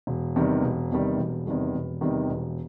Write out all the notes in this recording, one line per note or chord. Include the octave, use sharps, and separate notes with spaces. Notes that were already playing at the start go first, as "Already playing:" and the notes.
E1
E2 C3 D#3 G3
E1
E2 C3 D#3 G3
E1
E2 C3 D#3 G3
E1
E2 C3 D#3 G3
E1